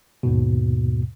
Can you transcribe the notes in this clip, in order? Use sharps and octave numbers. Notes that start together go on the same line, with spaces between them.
D#2 G#2 B2